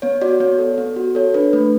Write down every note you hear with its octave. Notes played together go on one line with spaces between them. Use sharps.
B3 C#5
F#4 D5
B3 C#5
A4
B3
F#4
A4 C#5
D4 B4
A3 B4